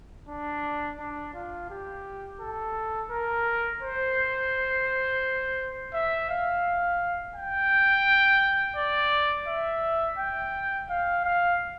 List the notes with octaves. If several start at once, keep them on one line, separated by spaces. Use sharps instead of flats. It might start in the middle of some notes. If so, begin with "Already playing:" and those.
D4
D4
F4
G4
A4
A#4
C5
E5
F5
G5
D5
E5
G5
F5
F5